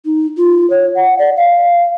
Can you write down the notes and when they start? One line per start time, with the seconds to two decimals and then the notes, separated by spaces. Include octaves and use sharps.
0.05 D#4
0.37 F4
0.70 C#5
0.96 F#5
1.19 D5
1.37 F5